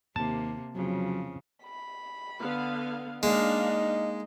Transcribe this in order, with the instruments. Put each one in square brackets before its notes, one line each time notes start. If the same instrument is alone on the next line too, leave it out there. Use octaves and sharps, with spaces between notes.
[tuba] D#2 [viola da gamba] C3 A#3 [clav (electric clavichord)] A5
[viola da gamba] F2 C#3 [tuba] F#3
[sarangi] B5
[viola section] D3 B3 F5
[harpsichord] G#3 [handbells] A#3 [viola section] D4 F5 [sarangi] D#4